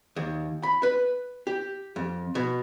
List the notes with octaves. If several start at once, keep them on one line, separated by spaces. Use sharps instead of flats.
D#2
B5
B4
G4
F2
B2